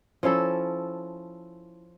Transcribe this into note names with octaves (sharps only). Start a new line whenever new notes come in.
F3 C#4 E4 A4